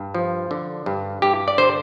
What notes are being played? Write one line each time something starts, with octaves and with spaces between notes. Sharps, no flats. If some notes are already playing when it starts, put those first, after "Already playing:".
Already playing: G2
F3
D3
G2
G2 G4
D5
D3 C5